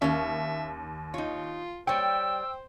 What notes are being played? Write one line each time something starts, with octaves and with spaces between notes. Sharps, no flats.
D#2 C#4 E5 F5
D#4 F4 C#5
G3 C5 C#5 G5 E6